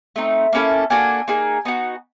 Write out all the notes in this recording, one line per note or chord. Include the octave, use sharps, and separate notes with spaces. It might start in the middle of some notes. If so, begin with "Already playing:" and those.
A3 C4 D#4
A#3 C#4 E4 A4
A#3 D4 F#4 A4 G#5
A#3 D#4 G#4
B3 D#4 F#4